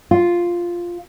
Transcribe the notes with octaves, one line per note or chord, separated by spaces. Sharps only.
F4